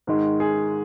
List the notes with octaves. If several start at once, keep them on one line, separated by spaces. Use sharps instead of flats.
G#2 D#3 G#3
G#4